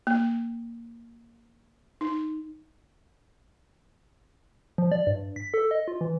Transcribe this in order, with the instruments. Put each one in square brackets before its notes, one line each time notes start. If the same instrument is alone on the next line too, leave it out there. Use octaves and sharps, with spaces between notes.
[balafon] A#3
D#4
[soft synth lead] F3
D5
G2
B6
A4
D#5
F4
E3